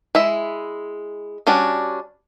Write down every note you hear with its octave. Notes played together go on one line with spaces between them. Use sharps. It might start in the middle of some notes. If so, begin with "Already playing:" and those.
G#3 E4 E5
G3 C#4 D4 F#4